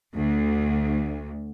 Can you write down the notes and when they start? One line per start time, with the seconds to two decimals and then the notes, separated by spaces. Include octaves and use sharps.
0.15 D2